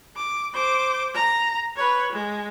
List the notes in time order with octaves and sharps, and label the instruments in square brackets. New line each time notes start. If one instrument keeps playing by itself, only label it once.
[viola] D6
C5 D6
A#5
B4 C#5
G#3